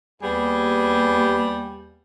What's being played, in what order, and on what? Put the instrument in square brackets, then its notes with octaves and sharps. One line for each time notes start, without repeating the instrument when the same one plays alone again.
[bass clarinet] D#2 [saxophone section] G3 B3 G#4